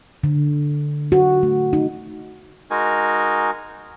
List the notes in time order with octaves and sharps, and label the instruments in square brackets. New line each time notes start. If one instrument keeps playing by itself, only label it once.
[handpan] D3
F#4
A3
D#4
[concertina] G#3 D#4 F#4 A#4 G#5